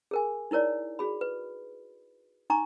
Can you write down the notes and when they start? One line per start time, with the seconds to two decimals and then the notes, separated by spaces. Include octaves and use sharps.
0.11 G#4 A#4 G#5
0.51 D#4 E4 A#4 C#5 D5
0.99 F#4 G#4 B5
1.21 B4
2.50 D#4 G#5 A#5 C#6 D6